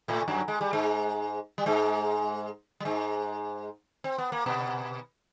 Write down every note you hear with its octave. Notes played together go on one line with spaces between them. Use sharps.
A2 A3
F#2 F#3
G#3
G3
G#2 G#3
G3
G#2 G#3
G3
G#2 G#3
C4
B3
A#3
B2 B3